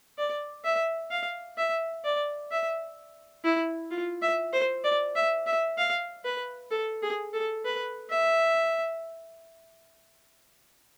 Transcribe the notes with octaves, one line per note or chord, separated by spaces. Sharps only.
D5
E5
F5
E5
D5
E5
E4
F4
E5
C5
D5
E5
E5
F5
B4
A4
G#4
A4
B4
E5